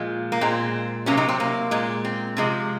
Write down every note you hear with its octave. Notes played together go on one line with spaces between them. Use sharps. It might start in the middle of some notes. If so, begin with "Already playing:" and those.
Already playing: A#2 F3 G#3
A#3
A#2 G#3 C4
C3 F#3 A#3 C#4
C4 D#4
C4
A#3
A#2 G#3
C4
C3 F3 G#3